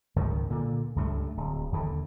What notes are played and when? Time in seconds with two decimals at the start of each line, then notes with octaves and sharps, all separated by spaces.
0.16 C#2 G#2 D#3
0.50 A#2 D3
0.96 C#2 G2 A3
1.37 D1
1.72 D#2 D3